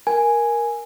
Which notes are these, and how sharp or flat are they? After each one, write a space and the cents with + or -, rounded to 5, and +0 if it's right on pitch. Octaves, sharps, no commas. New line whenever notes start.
A#4 +10 G#5 +0